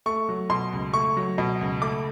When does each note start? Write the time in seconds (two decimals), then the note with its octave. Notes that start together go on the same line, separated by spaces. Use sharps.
0.06 A3 C#6
0.29 F#3
0.49 B2 C6
0.73 C#2
0.94 A3 C#6
1.17 F#3
1.38 B2
1.61 C#2
1.82 A3 D6